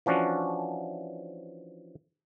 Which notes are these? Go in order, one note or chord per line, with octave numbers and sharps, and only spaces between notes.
E3 F3 C#4 D4 F#4